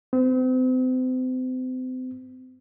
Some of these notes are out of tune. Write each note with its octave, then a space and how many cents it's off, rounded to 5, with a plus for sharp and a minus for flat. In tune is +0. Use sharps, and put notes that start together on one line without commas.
C4 -35